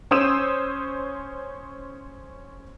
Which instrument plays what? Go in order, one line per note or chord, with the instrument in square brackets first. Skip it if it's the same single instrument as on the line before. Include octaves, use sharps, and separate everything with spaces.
[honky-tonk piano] C#4 C5 D#6 E6 E7